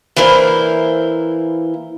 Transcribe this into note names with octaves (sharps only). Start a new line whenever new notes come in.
E3 A#3 E4 A#4 C5 D5